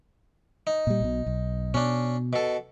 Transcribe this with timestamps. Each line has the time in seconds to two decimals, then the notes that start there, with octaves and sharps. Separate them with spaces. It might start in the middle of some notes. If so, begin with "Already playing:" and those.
0.67 D#4
0.87 A#2 G3
1.01 B1 B2
1.26 B1
1.74 B2 C#4 D4
2.33 B2 A4